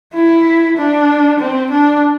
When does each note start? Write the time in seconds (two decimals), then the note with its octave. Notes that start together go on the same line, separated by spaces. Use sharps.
0.14 E4
0.77 D4
1.40 C4
1.71 D4